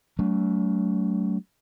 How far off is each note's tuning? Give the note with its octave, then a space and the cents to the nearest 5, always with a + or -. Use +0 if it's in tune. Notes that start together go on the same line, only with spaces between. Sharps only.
F#3 +35 A3 +0 D4 -45